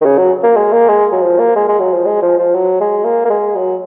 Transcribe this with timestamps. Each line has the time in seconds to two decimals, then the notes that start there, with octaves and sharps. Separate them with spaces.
0.01 D#3
0.05 C#3
0.18 F#3
0.43 A#3
0.56 G#3
0.72 A#3
0.89 G#3
1.12 F#3
1.22 F3
1.39 A#3
1.56 G#3
1.68 G#3
1.80 F#3
1.93 F3
2.06 G#3
2.22 F3
2.38 F3
2.55 F#3
2.80 G#3
3.04 A#3
3.25 A#3
3.30 G#3
3.55 F#3